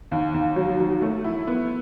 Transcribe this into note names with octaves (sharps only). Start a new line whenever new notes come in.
D#2
D#2
F#3
F#3
A3
E4
B3